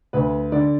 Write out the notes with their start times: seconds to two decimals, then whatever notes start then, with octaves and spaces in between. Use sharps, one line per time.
0.13 D2 B4
0.52 D3 D5